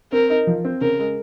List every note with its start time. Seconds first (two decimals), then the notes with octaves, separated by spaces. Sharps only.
0.12 C4 A#4
0.30 D#4
0.47 F3
0.65 C4
0.81 C#3 A#4
0.99 G#3